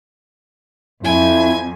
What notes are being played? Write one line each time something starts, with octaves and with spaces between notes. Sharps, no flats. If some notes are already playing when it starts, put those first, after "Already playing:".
F2 E4 G#5